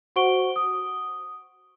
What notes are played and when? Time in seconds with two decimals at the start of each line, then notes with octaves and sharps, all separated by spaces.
0.16 F#4 C5 F#5 C#6 D7 G7
0.56 D#6